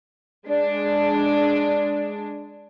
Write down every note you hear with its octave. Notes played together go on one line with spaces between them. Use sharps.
G#3 D4